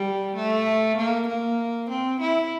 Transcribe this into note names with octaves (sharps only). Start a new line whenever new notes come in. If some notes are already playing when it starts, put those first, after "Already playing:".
Already playing: G3
A3
A#3
A#3
C4
E4